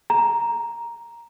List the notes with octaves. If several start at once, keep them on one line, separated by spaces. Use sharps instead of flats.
A#5